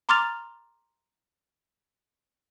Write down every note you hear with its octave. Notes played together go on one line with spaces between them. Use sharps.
A#5 C6 D6 F6 A6 F7